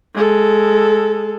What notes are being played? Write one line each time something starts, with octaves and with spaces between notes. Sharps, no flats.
G#3 A4